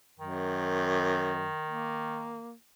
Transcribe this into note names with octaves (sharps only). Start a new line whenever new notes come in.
F#2 D#3
A#3